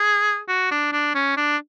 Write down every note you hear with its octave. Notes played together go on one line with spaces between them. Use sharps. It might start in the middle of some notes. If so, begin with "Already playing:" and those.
Already playing: G#4
F#4
D4
D4
C#4
D4